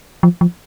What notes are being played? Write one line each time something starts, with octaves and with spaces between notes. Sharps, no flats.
F3
F3